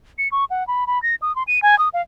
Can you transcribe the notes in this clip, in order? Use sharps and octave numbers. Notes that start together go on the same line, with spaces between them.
C#7
C#6
F#5
B5
B5
A#6
D#6
C6
D#7
G#5
D#6
F5